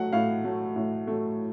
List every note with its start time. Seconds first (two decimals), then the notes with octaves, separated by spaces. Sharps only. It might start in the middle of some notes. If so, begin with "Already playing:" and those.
Already playing: F#3 A3 F#5
0.13 A2 F5
0.44 F#3 A3
0.76 A2
1.07 F#3 A3